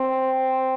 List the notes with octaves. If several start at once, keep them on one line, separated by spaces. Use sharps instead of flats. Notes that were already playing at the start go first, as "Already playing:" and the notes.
Already playing: C4